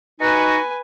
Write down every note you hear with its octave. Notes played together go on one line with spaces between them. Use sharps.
D#4 F#4 B4 G#5